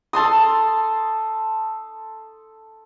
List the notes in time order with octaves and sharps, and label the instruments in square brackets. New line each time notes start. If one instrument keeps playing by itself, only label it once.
[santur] A4 A5 C6 D#6